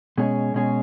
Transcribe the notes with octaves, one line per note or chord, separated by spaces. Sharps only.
B2 G#3 C#4 G#4
B2 G#3 C#4 G#4